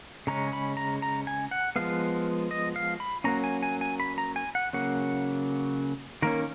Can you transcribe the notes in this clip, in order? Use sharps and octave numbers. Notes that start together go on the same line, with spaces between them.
C#3 G#3 C#4 A#5
B5
A#5
A#5
G#5
F#5
F3 G#3 B3 F5
D#5
F5
B5
F#3 A#3 C#4 A#5
G#5
G#5
G#5
B5
A#5
G#5
F#5
C#3 F#3 A#3 C#4 F#5
D#3 A#3 C#4 A#4